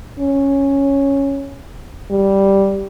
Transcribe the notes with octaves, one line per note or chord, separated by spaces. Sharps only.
C#4
G3